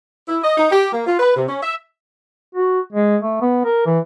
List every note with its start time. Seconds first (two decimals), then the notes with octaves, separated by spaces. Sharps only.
0.28 E4
0.44 D#5
0.57 D#4
0.71 G4
0.92 A#3
1.06 F4
1.19 B4
1.35 C3
1.48 C#4
1.63 E5
2.55 F#4
2.92 G#3
3.22 A3
3.42 B3
3.65 A#4
3.86 E3